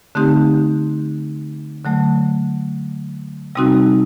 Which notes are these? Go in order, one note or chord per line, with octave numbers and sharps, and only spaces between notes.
D3 A3 C4 D#4 G4
D3 F#3 A3
C3 G3 C4 D#4 F#4